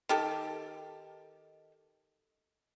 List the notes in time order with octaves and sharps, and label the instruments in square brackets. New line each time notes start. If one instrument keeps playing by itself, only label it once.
[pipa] D#3 G4 A4